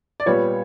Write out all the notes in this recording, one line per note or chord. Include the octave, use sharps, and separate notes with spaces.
D5
A#2 G3 B3 C#5